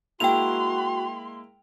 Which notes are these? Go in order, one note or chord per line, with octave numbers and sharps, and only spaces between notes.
G#3 A#3 E4 F#4 G5 C6 F7